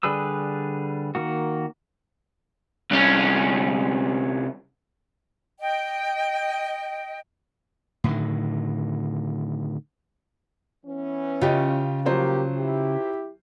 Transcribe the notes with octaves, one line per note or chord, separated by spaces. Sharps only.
D3 G3 G#4 B4 E6
D#3 A#3 F#4
C2 C#4
D#5 G5
A2 D3 D#3
E3 B3 C#4
C#3 F4 G4 D#5
F3 F#3 A#3 G4 C5
E4 G4